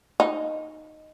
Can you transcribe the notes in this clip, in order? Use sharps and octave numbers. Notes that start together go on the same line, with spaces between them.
D#4